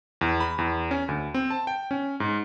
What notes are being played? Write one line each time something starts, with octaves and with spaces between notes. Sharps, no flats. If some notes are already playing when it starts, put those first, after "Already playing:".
E2
B5
E2
C#4
D2
C4
A5
G5
C#4
G#2